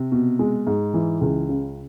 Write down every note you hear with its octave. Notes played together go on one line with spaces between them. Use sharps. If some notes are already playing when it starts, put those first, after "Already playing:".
Already playing: C3
B2
G#3
G#2
E3
C#2
C#3